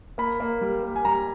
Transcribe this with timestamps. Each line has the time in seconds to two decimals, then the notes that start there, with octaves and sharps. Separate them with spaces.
0.18 A#3 B5
0.40 A#3
0.61 G3
0.83 A#3
0.96 G#5
1.05 G3 A#5